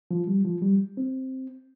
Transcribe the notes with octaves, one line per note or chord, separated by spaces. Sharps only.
F3
G3
F3
G3
C4